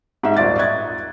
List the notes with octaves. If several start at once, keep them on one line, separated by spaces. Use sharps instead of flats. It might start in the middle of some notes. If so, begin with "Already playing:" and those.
G#2 D#5 E5
D#1 G#1 F4 D5 A6
D#5 E5 C#6 F#6 G#6 A6